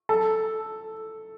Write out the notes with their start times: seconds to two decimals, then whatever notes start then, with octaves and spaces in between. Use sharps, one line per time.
0.09 A4